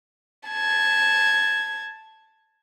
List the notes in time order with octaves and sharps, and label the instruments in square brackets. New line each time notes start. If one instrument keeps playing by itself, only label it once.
[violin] A5 G#6